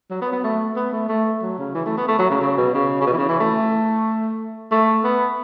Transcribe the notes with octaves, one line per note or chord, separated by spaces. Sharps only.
F#3
B3
B3
A3
B3
A3
A3
F#3
C#3
E3
A3
B3
A3
F#3
C#3
C#3
B2
C#3
C#3
B2
E3
C#3
E3
A3
A3
B3